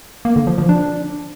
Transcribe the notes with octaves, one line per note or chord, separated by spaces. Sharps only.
A#3
D3
F3
F3
D4